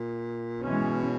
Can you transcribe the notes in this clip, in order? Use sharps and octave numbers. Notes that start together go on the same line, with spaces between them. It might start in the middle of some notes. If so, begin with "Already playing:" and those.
Already playing: A#2
B2 E3 G#3 C#4